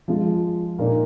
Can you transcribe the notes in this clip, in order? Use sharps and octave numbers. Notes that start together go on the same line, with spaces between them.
F3 G#3 F4
A#2 A#3 D#4